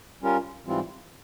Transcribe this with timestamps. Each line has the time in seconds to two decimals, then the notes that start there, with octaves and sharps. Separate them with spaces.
0.22 G3 C#4 F4 A#4
0.65 G#2 E3 G3 C4 F4